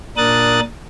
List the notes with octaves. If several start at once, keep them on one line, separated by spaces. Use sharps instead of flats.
A#2 D4 A#4 D#6 F#6 A6